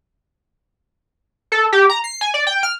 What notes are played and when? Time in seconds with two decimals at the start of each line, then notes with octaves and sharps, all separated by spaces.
1.52 A4
1.72 G4
1.90 A#5
2.04 C7
2.21 G#5
2.34 D5
2.47 G5
2.63 F6